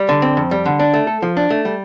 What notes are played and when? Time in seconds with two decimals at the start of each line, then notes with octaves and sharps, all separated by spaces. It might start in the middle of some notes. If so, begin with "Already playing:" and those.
Already playing: G3
0.09 D3
0.22 C4
0.37 F2
0.51 G3
0.66 D3
0.79 D4
0.94 A3
1.07 A4
1.22 F3
1.37 D4
1.50 A3
1.65 G3